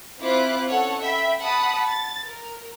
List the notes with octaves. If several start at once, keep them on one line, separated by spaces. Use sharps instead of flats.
C4 E4 F4 D6 F#6
C#4 A4 C#5 F#5
E5 G5 B5
F#5 A5 B5 D#6
A6
A#4